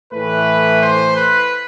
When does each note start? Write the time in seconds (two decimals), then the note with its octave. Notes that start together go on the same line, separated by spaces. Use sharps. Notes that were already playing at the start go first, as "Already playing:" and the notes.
0.13 A2 E3 A3 B4
0.82 C5
1.17 B4